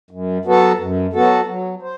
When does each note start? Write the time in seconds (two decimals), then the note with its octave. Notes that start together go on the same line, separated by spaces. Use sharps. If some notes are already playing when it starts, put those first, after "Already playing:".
0.11 F#2
0.45 F#3 B3 F#4 A4
0.79 F#2
1.13 F#3 B3 F#4 A4
1.48 F#3
1.82 C5